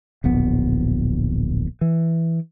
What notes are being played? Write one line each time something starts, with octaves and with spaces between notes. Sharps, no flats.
D1 A#1 B3
E3